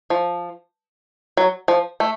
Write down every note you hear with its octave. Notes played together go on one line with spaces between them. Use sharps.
F3
F#3
F3
A3